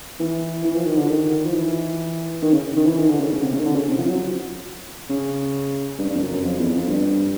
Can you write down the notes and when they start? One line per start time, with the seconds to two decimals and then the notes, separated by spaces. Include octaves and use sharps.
0.20 E3
0.64 E3
0.75 F3
0.86 D#3
0.97 D3
1.08 D#3
1.45 F3
1.54 E3
2.42 D#3
2.53 C#3
2.76 D#3
2.86 E3
2.99 D#3
3.09 D3
3.20 C#3
3.32 C#3
3.43 C3
3.53 C#3
3.60 D#3
3.65 D3
3.75 C#3
3.88 C3
3.99 F3
4.09 F#3
5.10 C#3
5.98 G2
6.09 G2
6.16 F2
6.21 F#2
6.32 F#2
6.44 F2
6.58 E2
6.73 F2
6.88 G2